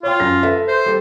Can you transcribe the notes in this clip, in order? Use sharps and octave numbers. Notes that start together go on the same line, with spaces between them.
F4 C#5 G5
F#2 A#6
A4 B4 E5
C5
G3 A4